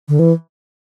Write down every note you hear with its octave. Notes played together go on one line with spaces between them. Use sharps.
D3
E3